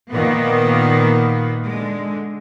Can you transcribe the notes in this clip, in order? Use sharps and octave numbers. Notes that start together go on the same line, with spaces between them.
A#2 D#3 A#3 B3
D3 G#3